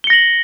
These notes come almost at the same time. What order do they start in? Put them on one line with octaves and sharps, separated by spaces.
G7 C#7 A#6 F#7